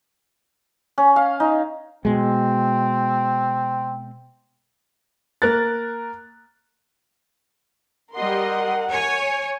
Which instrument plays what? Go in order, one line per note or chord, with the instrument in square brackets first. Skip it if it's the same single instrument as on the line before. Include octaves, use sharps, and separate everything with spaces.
[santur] C#4
F5
D#4
[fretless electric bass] B2 G#3 [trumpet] C4
[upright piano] A#3 A#4 F#6 A6
[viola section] G3 D#5 C6 [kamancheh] A#4 F#5
[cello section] C#5 [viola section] G#5